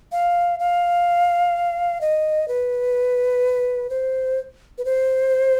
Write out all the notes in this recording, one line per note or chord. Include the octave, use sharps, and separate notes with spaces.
F5
F5
D#5
B4
C5
B4
C5